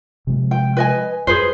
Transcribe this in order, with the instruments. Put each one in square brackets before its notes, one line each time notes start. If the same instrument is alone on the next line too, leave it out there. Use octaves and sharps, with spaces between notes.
[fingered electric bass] C3 F3 G#3
[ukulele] G5
B4 D#5 G#5
[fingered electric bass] F#2 [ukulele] G#4 B4 C5